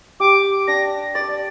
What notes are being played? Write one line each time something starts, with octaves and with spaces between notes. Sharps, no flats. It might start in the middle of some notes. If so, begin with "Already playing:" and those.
G4 D6
D4 A#6
D5 A6